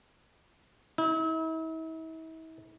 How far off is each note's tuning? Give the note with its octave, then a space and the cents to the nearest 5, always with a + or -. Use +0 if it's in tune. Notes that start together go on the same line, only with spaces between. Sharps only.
E4 -40